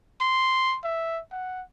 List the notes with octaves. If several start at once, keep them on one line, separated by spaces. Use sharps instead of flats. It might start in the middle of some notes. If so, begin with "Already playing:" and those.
C6
E5
F#5